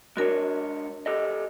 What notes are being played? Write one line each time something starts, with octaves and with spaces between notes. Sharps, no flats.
G#3 D4 F#4 A#4 C#5
G4 A4 D#5